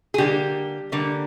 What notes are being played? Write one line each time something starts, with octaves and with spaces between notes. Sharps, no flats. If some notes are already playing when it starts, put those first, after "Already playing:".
G#4
D3 G3 A#3 G4
D3 G3 A#3